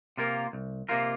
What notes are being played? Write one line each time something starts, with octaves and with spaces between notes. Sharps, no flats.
C3 A#3 F4 A#4
C2
C3 A#3 F4 A#4